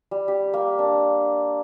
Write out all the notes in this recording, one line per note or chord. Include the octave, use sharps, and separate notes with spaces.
G3
G4
A#3
D4